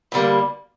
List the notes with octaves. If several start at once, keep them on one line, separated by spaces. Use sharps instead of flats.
G2 D3 G3 A#3